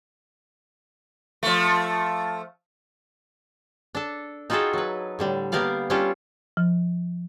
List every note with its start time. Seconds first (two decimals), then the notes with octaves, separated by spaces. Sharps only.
1.43 F3 A3
3.95 D4 A4
4.50 D#4 F4 F#4 G#4 A4 G5
4.73 F#3 B4
5.19 A2 D3 G3
5.52 A#3 B3 G4 A#4 D5 F5
5.90 G3 C#4 D4 F4 G4 A4
6.57 F3